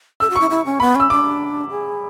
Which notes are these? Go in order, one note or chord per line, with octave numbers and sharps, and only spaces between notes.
A4 E6
F#4
E4 C#6
E4
C#4
B3 B5
C#4 E6
D4 D6
G#4